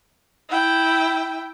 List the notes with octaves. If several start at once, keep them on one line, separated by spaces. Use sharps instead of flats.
E4 G5